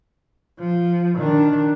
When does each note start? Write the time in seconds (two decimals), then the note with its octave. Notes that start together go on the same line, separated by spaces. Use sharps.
0.59 F3
1.18 D#3 D4